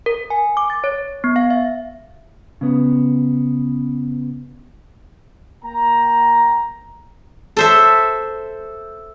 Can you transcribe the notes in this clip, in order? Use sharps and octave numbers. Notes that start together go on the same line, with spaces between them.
A#4
G#5
D6
A6
C#5
B3
F5
E5
C#3 B3
A#3 G5 A#5
A4 C5 E5